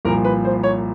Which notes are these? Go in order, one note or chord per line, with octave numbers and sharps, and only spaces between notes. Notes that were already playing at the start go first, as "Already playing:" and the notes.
C2 A#2 F3 A#4
B4
C5
C#5